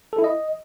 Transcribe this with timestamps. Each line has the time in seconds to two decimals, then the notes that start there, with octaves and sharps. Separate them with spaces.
0.13 A4
0.18 E4
0.24 D#5